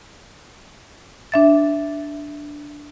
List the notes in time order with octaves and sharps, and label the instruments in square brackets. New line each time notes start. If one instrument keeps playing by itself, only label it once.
[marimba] D4 E5 A6